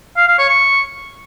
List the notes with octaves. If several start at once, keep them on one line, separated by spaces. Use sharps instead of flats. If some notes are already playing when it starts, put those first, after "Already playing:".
F5
F5
C#5
C#6